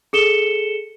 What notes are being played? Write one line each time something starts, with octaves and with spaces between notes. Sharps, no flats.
G#4 A4 C#7 E7 G7